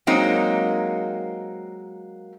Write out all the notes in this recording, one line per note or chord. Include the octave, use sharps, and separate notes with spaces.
F#3 G#3 A#3 C4 D#4